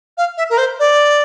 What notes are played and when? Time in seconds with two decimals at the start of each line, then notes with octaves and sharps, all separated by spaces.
0.18 F5
0.37 E5
0.50 A#4
0.58 C5
0.79 D5